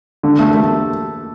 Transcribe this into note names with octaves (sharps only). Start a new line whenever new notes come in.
D3
A3
A3